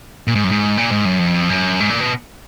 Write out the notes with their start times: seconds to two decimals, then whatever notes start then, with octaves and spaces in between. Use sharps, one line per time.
0.27 A#2
0.35 G#2
0.44 F#2
0.51 G#2
0.77 A#2
0.91 G#2
1.05 F#2
1.19 F2
1.49 F#2
1.80 G#2
1.90 A#2
2.01 B2